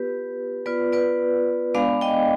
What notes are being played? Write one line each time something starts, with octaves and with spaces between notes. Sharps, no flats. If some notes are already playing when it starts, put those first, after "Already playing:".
Already playing: B3 F4 G4 B4
B3 F4 B4 D5
B4 D5
G#3 B3 D4 D5 F5
D#5 G5